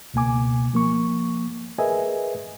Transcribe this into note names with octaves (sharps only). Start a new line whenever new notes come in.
C#2 B2 A#3 G#5 D6
F3 A#3 C#6
G#4 A#4 B4 D#5 E5 G#5